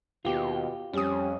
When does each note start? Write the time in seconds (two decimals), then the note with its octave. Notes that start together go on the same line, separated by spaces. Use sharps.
0.25 D#2 B2 F4 G4
0.93 F2 G3 C#4 D#6